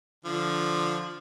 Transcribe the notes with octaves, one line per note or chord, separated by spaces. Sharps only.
D3 F3